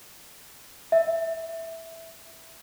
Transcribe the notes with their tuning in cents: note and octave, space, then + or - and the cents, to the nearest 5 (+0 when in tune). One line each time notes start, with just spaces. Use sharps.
E5 -5